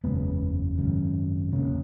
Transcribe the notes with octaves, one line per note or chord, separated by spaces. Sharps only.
F#1 E2 C#3 G#3 B3
G#1 F#2 C#3
E1 D#2 C#3 A#3 C#4